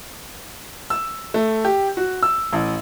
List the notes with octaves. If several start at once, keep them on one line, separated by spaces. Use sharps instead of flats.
E6
A3
G4
F#4
E6
A1